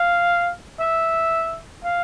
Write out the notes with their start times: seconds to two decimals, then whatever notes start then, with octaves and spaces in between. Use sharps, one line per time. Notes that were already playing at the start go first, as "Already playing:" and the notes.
Already playing: F5
0.80 E5
1.84 F5